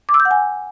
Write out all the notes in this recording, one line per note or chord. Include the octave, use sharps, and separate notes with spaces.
D6
E6
G6
F#5
G#5